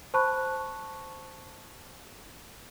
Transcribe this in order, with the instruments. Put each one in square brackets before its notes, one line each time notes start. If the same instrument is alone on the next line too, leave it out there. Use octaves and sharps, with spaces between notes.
[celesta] C5 A5 B5 C#6 F#6